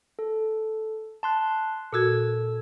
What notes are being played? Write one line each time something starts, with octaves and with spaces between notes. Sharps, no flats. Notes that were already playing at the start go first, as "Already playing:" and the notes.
A4
A5 C6 F#6
A#2 F#4 A4 E6 G#6